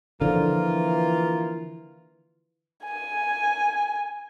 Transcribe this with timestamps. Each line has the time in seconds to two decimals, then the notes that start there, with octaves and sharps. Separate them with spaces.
0.21 D3 E3 F3 A#3 F4
2.85 G#5